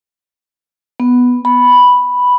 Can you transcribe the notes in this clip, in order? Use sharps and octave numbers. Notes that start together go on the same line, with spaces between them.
B3
B5